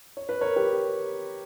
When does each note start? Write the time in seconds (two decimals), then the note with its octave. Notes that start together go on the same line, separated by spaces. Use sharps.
0.17 C#5
0.29 B4
0.41 A#4 C#5
0.56 G4 B4